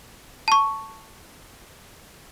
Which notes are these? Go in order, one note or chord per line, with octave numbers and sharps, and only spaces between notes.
A5 C#6